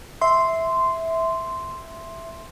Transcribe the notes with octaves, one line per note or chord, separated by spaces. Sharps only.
E5 C6